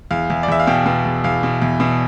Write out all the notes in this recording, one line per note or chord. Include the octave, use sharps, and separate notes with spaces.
E2 F5
E2
D5
E2 E5
F5
B2 G5
B2
E2
E2 F5
B2
E2
B2 E5